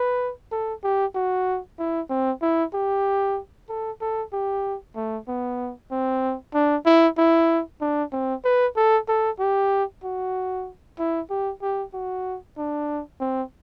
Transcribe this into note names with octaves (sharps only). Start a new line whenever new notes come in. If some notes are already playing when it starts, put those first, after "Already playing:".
Already playing: B4
A4
G4
F#4
E4
C4
E4
G4
A4
A4
G4
A3
B3
C4
D4
E4
E4
D4
C4
B4
A4
A4
G4
F#4
E4
G4
G4
F#4
D4
C4